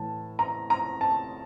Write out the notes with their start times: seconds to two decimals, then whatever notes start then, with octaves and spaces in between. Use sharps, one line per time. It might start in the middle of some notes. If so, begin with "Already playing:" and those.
Already playing: A2 E3 A5
0.39 A#5
0.70 A#5
1.01 A5